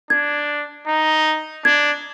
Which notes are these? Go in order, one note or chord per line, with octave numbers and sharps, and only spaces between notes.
D4 G#6
D#4
D4 G#6